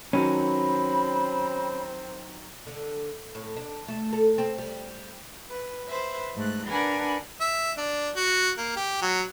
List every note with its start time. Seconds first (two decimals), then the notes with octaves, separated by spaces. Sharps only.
0.13 D#3 F#3 C4 C#4 B5
2.67 D3
3.35 A2
3.57 D4
3.88 A3
4.13 A4
4.38 C4
4.58 G3
5.49 B4
5.86 B4 C5 E5
6.36 G#2 A3 F#6
6.69 D4 A#4 B4 F#5 G#5 B5
7.41 E5
7.78 D4
8.16 F#4
8.58 A#3
8.76 G4
9.02 F#3